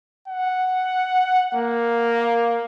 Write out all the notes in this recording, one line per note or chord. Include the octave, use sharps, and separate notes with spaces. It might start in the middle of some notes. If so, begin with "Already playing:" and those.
F#5
A#3